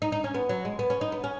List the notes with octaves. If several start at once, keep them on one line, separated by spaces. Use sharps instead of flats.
D#4
D#4
C#4
B3
F#3
G#3
B3
C#4
D#4
B3
C#4